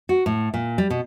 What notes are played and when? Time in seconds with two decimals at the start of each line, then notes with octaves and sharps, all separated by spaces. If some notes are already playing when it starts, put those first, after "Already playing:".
0.09 F#4
0.26 A2
0.54 A#2
0.78 G3
0.90 B2